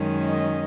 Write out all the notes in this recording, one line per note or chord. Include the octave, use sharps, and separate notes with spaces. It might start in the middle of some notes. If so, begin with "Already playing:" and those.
Already playing: F#2 D#3 G#3 C#4
D#5